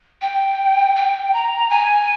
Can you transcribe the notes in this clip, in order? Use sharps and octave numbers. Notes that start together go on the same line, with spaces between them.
G5
G5
A#5
G#5